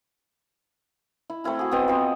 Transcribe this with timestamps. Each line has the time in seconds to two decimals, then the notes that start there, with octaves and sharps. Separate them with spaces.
1.30 E4
1.44 A3 C4 E4 A#4
1.59 F#4 G#4
1.71 B3 C4 D#5
1.88 F3 C4